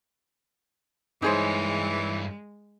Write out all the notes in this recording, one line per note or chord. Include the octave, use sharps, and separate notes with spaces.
G2 E3 G#3 D#4 G#4 C5 C#5